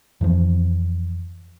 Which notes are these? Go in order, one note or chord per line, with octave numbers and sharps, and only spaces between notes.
F2 E3 F3